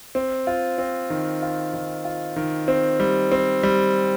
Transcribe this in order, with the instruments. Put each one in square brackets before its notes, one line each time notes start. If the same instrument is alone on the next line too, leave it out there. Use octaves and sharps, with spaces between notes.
[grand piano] C4
F4
C4
D#3
F4
D#3
F4
D#3
C4
G3
C4
G3